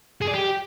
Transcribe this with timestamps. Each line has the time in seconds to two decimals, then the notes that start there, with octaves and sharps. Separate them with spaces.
0.21 G#4
0.27 D5
0.34 G4